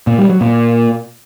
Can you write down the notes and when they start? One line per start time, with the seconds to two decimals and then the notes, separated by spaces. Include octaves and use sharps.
0.07 A#2
0.18 G3
0.30 F#3
0.41 A#2